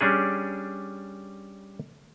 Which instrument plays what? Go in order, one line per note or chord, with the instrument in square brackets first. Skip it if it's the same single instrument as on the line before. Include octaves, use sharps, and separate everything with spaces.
[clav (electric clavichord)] G3 C#4 D4 G#4